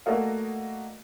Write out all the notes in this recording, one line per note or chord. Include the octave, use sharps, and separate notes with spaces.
A3 A#3 F#4 D5 D#5 F5